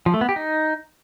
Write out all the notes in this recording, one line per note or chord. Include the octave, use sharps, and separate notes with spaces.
F3
A3
B3
G4
D#4